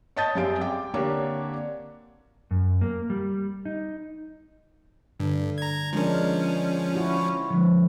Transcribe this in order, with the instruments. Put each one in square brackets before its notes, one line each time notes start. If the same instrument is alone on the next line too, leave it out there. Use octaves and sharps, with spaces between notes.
[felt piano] C#5 D#5 A5 D#6 G6 A6
F#2 G3 C4 G#4 F5 D7
G5 D6
D3 A#3 C4 D4 G4 C#5
[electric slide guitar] F#2
A#3
G3
D#4
[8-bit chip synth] G2 [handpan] D3
[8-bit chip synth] A#5 G#6
[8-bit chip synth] F3 C#4 [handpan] G#3 D4 A#4
[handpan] E4 F#4
[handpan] D3 [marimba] F3 G#3